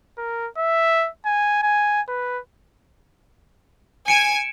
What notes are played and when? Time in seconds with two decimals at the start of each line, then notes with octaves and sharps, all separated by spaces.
0.18 A#4
0.57 E5
1.25 G#5
1.62 G#5
2.08 B4
4.08 G#5 C#7 D7 E7